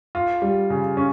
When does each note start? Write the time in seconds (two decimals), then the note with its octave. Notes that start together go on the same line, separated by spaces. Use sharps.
0.15 F4
0.42 G3
0.70 C#3
0.97 C#4